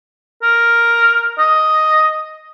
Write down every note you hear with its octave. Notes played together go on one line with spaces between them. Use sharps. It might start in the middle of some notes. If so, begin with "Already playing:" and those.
A#4
D#5